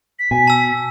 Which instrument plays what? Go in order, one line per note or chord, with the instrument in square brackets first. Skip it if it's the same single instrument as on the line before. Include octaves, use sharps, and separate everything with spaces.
[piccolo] B6
[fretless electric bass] B2 [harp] G#5
[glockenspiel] A5 E6